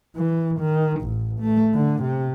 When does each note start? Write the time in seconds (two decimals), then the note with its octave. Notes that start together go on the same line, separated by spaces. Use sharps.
0.16 E3
0.60 D#3
1.01 A1
1.40 A3
1.74 D3
2.03 C3